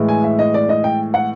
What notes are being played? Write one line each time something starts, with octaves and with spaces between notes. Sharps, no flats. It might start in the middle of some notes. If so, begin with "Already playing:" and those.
Already playing: A2 E3 G#3
G#5
E5
D#5
D5
D#5
G5
F#5